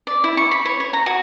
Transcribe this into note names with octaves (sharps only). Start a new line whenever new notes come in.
D5
E4
C#6
B5
C#5
C#5
A#5
F#4